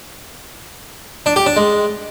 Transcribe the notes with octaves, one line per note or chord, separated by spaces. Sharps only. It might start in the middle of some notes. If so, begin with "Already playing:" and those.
D4
G4
D4
G#3